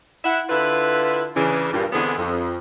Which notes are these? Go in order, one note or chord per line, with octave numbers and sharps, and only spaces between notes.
E4 E5 F#5
D3 E4 F4 B4
C#3 E3 D4
G2 A#2
E2 D3 B3 C4 D4 G#4
F2